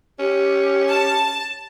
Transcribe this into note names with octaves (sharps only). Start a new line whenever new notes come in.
C#4 G4
A5